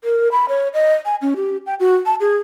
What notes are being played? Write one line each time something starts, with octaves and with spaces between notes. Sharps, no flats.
A#4
B5
C#5
D#5
G#5
C#4
G4
G5
F#4
A5
G#4